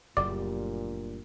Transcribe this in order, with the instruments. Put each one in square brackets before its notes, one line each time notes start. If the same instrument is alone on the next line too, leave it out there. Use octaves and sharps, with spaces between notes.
[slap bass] F#1 [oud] D2 G3 C5 [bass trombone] A#2 [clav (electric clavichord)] D5